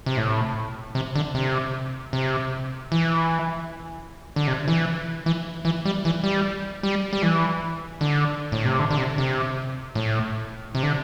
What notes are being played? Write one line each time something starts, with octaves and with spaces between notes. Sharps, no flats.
C3
A2
C3
D3
C3
C3
E3
D3
C3
E3
E3
E3
G3
E3
G3
G3
G3
E3
D3
A2
C3
D3
D3
C3
C3
A2
C3
D3